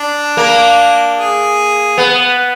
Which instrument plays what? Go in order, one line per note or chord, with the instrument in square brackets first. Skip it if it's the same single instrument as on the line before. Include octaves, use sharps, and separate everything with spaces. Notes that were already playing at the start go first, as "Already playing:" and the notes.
Already playing: [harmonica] D4
[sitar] A#3
[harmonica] G#4
[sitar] B3